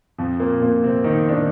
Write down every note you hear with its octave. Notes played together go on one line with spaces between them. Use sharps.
F2 F3
A#2 A#3
A#2 A#3
C3 C4
D#3 D#4
D4
D#3 D#4